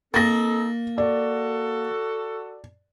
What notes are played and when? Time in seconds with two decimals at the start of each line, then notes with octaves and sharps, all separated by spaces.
0.14 A#3 C4 D#4 A4 A6 A#6
0.98 F#4 A4 D5